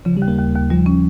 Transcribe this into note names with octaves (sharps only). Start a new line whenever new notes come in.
C#3 F3
G3
D#2
A#3
D#2
D#2
F3 G3
C#4